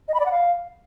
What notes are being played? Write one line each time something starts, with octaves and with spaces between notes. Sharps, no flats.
D#5
B5
D5
F#5
F5